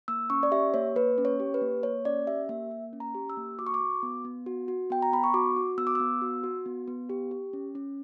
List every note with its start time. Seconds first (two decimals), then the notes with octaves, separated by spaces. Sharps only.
0.08 A#3 E6
0.30 C#4 C#6
0.43 D5
0.51 G4 E5
0.74 A#3 C#5
0.96 A#3 B4
1.18 C#4
1.25 C#5
1.40 G4
1.54 B4
1.61 A#3
1.83 A#3 C#5
2.05 C#4 D5
2.27 G4 E5
2.49 A#3 E5
2.71 A#3
2.93 C#4
3.00 A#5
3.15 G4
3.30 E6
3.37 A#3
3.59 F#4 D6
3.67 C#6
3.74 D6
3.81 F#4
4.03 B3
4.25 B3
4.46 F#4
4.68 F#4
4.90 B3 G5
5.02 A#5
5.12 B3 B5
5.24 C#6
5.34 F#4 D6
5.56 F#4
5.78 B3 E6
5.87 D6
5.95 B3 E6
6.22 F#4
6.44 F#4
6.66 B3
6.88 B3
7.10 G4
7.31 G4
7.53 C#4
7.75 C#4